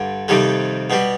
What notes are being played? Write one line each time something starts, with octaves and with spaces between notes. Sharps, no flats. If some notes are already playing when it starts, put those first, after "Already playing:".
Already playing: G2 D3
F2 C3 D#3 G3
B2 G3